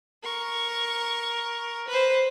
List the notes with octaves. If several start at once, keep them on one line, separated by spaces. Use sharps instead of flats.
A#4 C#6
B4 C5